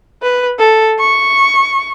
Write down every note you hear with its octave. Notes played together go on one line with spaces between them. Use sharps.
B4
A4
C#6